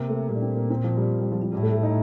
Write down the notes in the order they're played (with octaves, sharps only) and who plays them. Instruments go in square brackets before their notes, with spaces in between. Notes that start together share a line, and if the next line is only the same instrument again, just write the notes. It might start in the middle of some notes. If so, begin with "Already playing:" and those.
Already playing: [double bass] C3 [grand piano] A#3
[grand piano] A3
[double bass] A#2 [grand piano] G3
[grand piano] D4
C4
A#3
C4
F3
G3
G3
F3
F3
[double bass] A2 [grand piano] G3
[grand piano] A3
A3
D#4